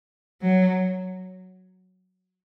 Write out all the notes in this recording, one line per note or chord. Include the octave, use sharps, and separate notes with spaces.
F#3